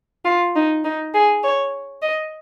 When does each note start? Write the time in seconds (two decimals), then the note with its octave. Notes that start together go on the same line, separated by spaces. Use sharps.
0.25 F4
0.56 D#4
0.85 D#4
1.14 G#4
1.44 C#5
2.03 D#5